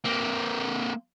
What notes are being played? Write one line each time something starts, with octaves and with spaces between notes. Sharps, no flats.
A#3 C4